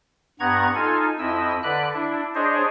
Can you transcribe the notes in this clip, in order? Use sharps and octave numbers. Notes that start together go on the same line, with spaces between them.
G2 B3 F#5 A#5 C#6 G#6
D#4 F4 A4 G#5
F2 E4 D#5 E6
D3 B4 D5 B5 F#6
D4 E4
D4 G#4 C5 C#5 D#5